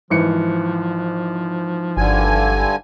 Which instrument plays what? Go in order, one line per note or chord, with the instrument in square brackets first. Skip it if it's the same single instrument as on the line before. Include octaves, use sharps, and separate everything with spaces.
[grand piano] G#1 E3 C#7 [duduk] F3
[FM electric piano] G1 [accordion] G2 D3 G#5